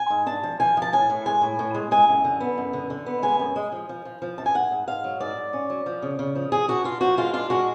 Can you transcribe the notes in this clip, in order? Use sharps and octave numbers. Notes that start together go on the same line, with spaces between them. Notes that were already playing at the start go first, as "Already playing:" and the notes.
Already playing: G#5
G#2
D4 A5
F3
F3 G#5
F3
A5
A2 G#5
A2
G#3 G#5
A2
A2
G#3
G#3 G#5
F#2
D3
B3
F#2
D3
D3
B3
G#3 G#5
F#2
G#3
F3
F3
F3
F3
F#2 A5
G#5
G#2 F#5
G#2
G#2 F5
F#3
G#2 D5
G#2
C#4
F#3
F3
C#3
C#3
F3
F3 G#4
D4 F#4
D4 F4
F3 F#4
G#3 F4
D4 F4
G#3 F#4